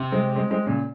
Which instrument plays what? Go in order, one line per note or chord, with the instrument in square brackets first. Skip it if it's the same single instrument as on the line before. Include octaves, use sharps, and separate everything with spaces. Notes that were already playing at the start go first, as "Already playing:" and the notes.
Already playing: [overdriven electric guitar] C3
[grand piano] G#3 C4
G#3 C4
G#3 C4
A#2 C#3